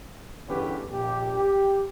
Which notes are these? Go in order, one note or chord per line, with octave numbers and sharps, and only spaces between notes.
E2 G2 D3 C#4 G4 B4
A#1 A#2 G4
G4